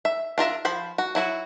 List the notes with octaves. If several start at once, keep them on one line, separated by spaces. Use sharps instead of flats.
E5
D4 F4 A#4 E5
F3 C5 B5
F#4
F#3 E4 F#4